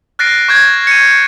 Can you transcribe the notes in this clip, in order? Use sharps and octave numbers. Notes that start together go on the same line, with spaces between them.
F6 F#6 A6 A#6 C7 D7
C#6 G6 G#6
C#7 D#7